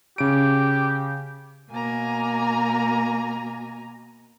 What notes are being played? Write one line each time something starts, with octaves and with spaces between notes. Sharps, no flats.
C#3 G4 D7
B2 A#3 G#5 A#5